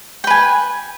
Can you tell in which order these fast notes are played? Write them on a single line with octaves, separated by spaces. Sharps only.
G5 B4 G#5